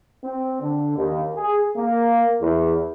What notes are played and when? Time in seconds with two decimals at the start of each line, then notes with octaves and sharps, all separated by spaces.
0.24 C4
0.61 D3
0.97 D#2
1.35 G#4
1.76 A#3
2.40 E2